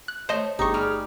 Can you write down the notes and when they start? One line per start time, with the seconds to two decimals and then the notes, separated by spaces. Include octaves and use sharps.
0.08 F#6
0.29 A3 C5 C#5 D#5
0.59 G1 D#4 G4 G#4 C#6
0.74 G3 F6